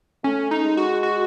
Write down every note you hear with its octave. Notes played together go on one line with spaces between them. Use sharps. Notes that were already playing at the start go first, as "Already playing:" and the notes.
A3 C#4
D#4
G#3
F#4
F#4